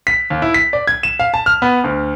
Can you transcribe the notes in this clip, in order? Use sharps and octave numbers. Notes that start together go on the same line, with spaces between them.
B6
D#2
E4
B6
D5
G#6
E7
F5
A5
F6
B3
D2